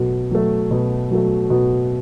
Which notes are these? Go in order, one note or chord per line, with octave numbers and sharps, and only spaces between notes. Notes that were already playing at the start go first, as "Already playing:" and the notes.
Already playing: B2 F#3 A3
F#3 A3
B2
F#3 A3
B2